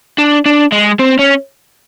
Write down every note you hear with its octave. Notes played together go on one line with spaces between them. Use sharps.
D4
D4
G#3
C4
C#4